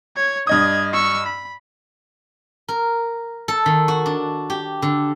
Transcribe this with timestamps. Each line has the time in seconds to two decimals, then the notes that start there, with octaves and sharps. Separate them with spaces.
0.16 C#5 G#6
0.47 G2 D#5 D#6 G#6
0.93 C#6 E6
1.26 B5
2.68 A#4
3.48 A4
3.66 D#3
3.88 F#4
4.06 D4
4.50 G4
4.82 D3